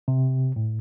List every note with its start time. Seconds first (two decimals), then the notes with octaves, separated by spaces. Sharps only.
0.08 C3
0.56 A2